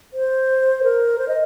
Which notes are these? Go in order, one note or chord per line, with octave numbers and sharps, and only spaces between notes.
C5
A#4
C5
D#5